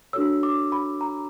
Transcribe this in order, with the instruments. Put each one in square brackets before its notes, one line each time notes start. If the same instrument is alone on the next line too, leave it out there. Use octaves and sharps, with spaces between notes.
[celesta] D4 F#4 A4 C#5 E6
D6
B5
A#5